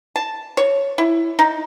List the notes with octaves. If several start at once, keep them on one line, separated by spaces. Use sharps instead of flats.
A5
C#5
E4
D#4